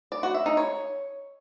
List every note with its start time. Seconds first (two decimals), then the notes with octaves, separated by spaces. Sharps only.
0.12 D5
0.23 F#4
0.34 E5
0.46 D#4
0.57 C#5